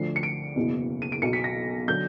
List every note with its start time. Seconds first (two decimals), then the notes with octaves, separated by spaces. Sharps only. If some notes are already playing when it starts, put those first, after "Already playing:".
Already playing: D2 D3 F3 C7
0.16 C#7
0.23 D7
0.56 F#1 E2 B2
1.02 D#7
1.12 D7
1.22 B1 B2 F#3 C#7
1.33 B6
1.44 A#6
1.88 D3 F#3 G6